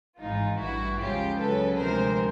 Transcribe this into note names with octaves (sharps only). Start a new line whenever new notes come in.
G#1 G#2 E3 G#3 D#4 F4
A1 G2 E3 G3 E4 F#4
D#2 C#3 F3 G#3 F4 G4
C#2 C#3 F#3 A4 B4
D2 C3 F3 G#3 A#4 C5